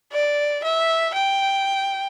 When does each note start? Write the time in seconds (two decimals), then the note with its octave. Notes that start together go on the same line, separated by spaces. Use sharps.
0.13 D5
0.64 E5
1.14 G5